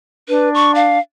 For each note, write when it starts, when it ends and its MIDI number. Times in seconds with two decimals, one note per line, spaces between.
0.29 0.98 62
0.29 0.50 71
0.54 0.72 85
0.75 1.00 77